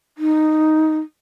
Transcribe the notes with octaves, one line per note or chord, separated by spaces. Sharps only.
D#4